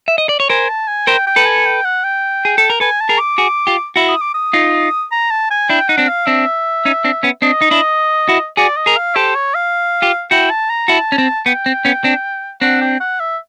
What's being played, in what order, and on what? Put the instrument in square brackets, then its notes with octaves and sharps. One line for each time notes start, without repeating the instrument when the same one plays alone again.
[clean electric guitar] E5
D#5
D5
C#5
[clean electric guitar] A#4 C5 [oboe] G#5
[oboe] A5
G#5
[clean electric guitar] A#4 C5 [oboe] G5
[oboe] G5
[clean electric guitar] A4 B4
[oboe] G#5
G5
F#5
G5
[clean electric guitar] G#4
A4
A#4
[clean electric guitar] A4 B4 [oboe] G#5
[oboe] A5
[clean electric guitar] G#4 A#4
[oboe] D6
[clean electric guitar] F#4 G#4
F4 G4
E4 F#4
[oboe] D#6
D6
D#6
[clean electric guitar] D#4 F4
[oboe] A#5
A5
G#5
[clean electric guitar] D4 E4 [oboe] G5
[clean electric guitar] D#4 [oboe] F#5
[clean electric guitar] C4 D4
[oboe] F5
[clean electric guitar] C4 D4 [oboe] E5
[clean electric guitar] C#4 D#4
C4 D4
B3 C#4
[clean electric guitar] C4 D4 [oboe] D#5
[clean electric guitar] D#4
D4 E4
E4 F#4
[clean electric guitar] F#4 G#4 [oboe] D5
[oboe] D#5
[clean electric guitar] G#4 A#4
[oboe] F5
[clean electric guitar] G4 A4 [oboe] C5
[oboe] C#5
F5
[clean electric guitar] F4 G4
[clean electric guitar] E4 F#4 [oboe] G5
[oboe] A5
A#5
[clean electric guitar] E4 F#4 [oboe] A5
[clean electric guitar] C#4
C4
[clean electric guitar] B3 [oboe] G5
[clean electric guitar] C4
B3 C#4
C4 D4
[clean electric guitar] C4 D4 [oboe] F#5
[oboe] G5
F#5
E5